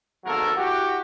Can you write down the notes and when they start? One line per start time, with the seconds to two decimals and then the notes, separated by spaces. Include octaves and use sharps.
0.25 G#1 E2 F#3 A#3 A4 A#4
0.56 E4 F#4 G4